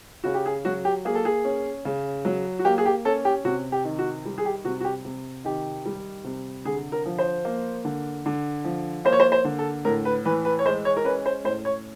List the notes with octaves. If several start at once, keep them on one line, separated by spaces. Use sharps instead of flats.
C#3 F#4
G4
G#4
F#3 F#4
G4
A#3 G#4
A4
G#4
C#4
C#3
F#3
F#4
A#3 G4
G#4
G4
C#4 A4
G4
C3 F#4
G4
D#3
F#4
G3
G#4
G4
C3 F#4
F#4
G4
C3
D#3 G4
G3
C3
D3 G#4
A#4
F3
C5
A#3
D3
D3
F3
A#3 C5
C#5
C5
C5
D3
A4
A2 A#4
B4
E3 B4
B4
C#5
G#3 C5
C#5
A#4
C#4 B4
C5
A2 C5
C#5